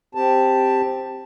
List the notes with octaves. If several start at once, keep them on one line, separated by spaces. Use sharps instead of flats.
C4 G4 A5